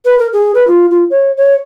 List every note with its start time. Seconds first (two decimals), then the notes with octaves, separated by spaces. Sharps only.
0.05 B4
0.19 A#4
0.33 G#4
0.55 B4
0.67 F4
0.91 F4
1.10 C#5
1.37 C#5